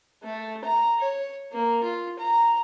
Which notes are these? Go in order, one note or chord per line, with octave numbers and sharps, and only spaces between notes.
A3
A#5
C#5
A#3
F4
A#5